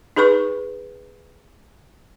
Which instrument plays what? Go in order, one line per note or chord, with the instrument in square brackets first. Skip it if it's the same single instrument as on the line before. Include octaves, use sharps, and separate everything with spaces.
[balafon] D#4 G#4 B4 B5 C#6